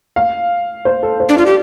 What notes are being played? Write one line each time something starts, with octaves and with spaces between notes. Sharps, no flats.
F5
C5
A4
C5
D4
F4 D5
G4